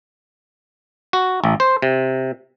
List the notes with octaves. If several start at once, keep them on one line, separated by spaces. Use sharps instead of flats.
F#4
A1
C5
C3